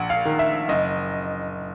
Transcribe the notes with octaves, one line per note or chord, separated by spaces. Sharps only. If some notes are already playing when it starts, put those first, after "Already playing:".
Already playing: A#1 F#5
F5
D#3
E5
F#1 D#5